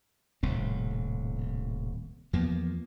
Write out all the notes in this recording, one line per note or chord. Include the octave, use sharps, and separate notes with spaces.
D#1 C2 A2 C4
E2 F3 A#3 B3